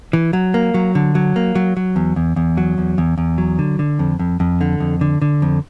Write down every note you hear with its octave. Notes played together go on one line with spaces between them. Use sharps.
E3
F#3
A#3
F#3
D3
F#3
A#3
F#3
F#3
E2
E2
E2
F#3
E2
E2
E2
F#3
D3
D3
F2
F2
F2
D3
F2
D3
D3
F2